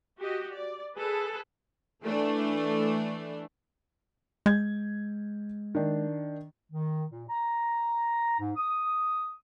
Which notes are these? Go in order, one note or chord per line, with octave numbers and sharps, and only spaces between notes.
F#4 G4 D#5
D5
G#4 A4 B4
E3 A3 D4
G#3 G6 G#6
D#3 D4
D#3
A#2
A#5
G#2
D#6